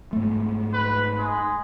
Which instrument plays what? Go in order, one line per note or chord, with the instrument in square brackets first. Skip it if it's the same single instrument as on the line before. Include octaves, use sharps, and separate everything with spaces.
[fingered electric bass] G#2 A3
[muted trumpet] B4
G#3